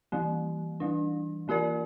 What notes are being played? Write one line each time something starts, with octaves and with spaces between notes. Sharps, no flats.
E3 G3 A#3
E3 G3 D4
E3 A#3 F4 A#4 D5